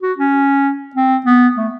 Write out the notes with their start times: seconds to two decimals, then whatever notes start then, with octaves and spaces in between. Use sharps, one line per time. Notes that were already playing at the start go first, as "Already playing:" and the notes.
0.02 F#4
0.18 C#4
0.95 C4
1.26 B3
1.57 A3